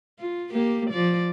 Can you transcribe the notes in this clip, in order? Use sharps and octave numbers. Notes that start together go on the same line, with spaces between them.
F4
A#3 G4
F3 D5